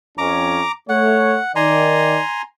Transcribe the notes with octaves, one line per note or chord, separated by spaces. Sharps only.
F2 C#4 A#5 D6
A3 C#5 F#5
D#3 D5 G#5 A#5 C6